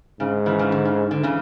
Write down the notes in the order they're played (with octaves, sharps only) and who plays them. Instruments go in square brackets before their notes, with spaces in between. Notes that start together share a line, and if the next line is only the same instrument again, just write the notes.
[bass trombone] G#2 [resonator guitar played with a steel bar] C#3
[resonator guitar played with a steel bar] C#3 E3
C#3 E3
D3
C#3
D3
C#3 E3